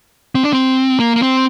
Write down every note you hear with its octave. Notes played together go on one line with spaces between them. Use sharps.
C4
D4
C4
A#3
A#3
C4